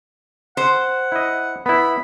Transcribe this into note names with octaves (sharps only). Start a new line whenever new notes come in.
C5 F#5
E4 D#5
B3 E4 B5